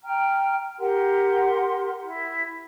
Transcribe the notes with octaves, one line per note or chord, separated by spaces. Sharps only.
G5 A#5 F6
G4 A#4 F#5 C6
E4